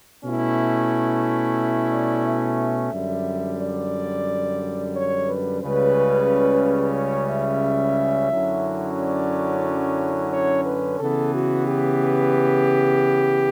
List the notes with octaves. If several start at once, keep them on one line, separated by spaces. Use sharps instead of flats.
B2 A3 C#4 E4
D5
E5
F#2 D3 G3
D5
C#5
B4
C#2 C#3 G3 C#4 B4
C#5
E5
F#2 D3 F#3 C#4 E4
D5
C#5
B4
C#3 E3 B3 A4
F#4
G4